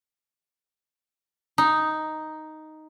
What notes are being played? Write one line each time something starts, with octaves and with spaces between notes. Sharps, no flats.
D#4